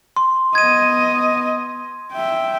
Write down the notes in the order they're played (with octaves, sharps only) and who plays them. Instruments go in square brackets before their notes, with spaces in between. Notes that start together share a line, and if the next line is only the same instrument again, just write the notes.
[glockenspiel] C6
[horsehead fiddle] B3 D#5 [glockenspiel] G#6 D#7
[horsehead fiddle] E5 G5